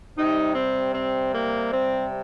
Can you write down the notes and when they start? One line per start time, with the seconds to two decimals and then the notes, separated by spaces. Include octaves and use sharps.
0.16 C3 G3 D#4
0.55 C4
0.94 C4
1.32 A#3
1.72 C4